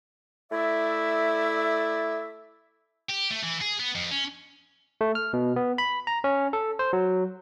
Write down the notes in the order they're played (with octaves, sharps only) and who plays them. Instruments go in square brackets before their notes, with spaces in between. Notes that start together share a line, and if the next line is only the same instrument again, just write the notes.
[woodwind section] A3 E4 D5 E5
[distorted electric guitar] G4
A3
E3
G#4
B3
F2
C#4
[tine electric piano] A3
F6
B2
B3
B5
A#5
C#4
A4
C5
F#3